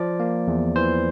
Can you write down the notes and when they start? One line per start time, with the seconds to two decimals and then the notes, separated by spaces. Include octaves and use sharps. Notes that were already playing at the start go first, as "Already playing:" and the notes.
Already playing: F3 D5
0.20 A#3
0.47 E2
0.76 E3 C5